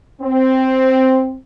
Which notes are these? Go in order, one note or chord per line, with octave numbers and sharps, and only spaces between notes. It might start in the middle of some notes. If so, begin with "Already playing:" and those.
C4